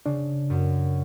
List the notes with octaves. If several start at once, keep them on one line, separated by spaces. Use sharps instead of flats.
C#3 D4
F#2